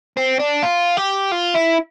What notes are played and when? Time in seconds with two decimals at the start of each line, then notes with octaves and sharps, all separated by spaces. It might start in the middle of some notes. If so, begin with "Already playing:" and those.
0.17 C4
0.39 D4
0.62 F4
0.97 G4
1.32 F4
1.54 E4